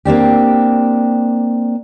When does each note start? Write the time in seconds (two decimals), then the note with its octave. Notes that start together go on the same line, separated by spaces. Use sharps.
0.05 A#3 C4 D4 G4